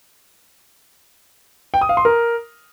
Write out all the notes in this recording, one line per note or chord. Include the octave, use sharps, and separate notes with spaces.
G5
D#6
F5
C6
A#4